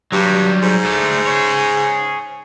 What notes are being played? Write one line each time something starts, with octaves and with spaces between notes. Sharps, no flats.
G2 F#3 G3
G#2
A3 D4
G#4 C#5